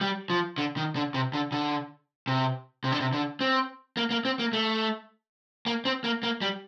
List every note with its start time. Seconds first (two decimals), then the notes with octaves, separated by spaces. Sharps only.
0.01 G3
0.30 F3
0.58 D3
0.77 D#3
0.96 D3
1.14 C3
1.33 D3
1.52 D3
2.27 C3
2.84 C3
2.92 D3
3.00 C3
3.13 D3
3.41 C4
3.97 A#3
4.11 A#3
4.25 C4
4.39 A#3
4.53 A3
5.66 A#3
5.85 C4
6.04 A#3
6.23 A#3
6.41 G3